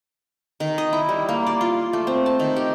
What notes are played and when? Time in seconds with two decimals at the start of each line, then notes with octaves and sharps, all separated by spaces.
0.60 D#3
0.78 D#5
0.93 E4
1.09 G3
1.29 A#3
1.47 D5
1.61 F4
1.93 A3
2.07 C4
2.26 A5
2.39 D#3
2.56 G4